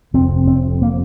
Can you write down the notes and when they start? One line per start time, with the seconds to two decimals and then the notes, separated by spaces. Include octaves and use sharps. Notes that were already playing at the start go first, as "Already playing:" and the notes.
0.14 F1 F2 C3 C4
0.47 C4
0.82 A#3